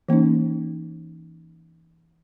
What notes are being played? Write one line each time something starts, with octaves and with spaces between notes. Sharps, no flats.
E3 A#3 C#4 D#4